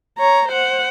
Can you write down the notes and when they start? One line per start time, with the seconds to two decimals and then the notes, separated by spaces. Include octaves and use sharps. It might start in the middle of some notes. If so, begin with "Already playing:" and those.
0.19 C#5 A#5
0.48 C5 F#5